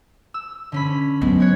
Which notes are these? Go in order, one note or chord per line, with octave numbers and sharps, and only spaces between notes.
E6
D3 C#4 B5
F#3 G#3 B3
C#5 F#6 G#6